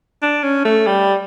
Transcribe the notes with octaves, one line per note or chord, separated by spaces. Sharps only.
D4
C#4
A3
G3